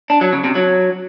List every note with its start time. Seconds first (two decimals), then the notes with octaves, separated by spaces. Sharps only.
0.10 D4
0.21 F#3
0.33 C#3
0.44 C3
0.55 F#3